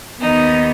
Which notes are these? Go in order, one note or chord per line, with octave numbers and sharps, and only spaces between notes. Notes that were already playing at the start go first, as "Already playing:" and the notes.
D#2 D#3 B3 D#4